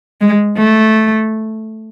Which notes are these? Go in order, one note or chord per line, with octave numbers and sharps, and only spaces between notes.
G#3
A3